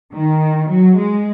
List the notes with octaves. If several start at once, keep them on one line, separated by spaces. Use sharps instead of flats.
D#3
F#3
G#3